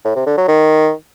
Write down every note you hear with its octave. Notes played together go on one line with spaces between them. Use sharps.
A2
C3
D3
F#3
D#3